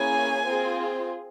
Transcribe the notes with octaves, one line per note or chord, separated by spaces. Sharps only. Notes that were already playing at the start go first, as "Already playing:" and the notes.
Already playing: A#3 C#4 E4 G#4 G#5
C4 F4 G#4